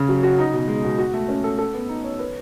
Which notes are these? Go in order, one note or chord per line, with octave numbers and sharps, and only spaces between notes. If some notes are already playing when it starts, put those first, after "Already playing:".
Already playing: C#3 C#4
F#3
F#4
D#4
B2
G#3
B2
F#4
A3
C#4
A4
A4
B3
D#4
C#5
B4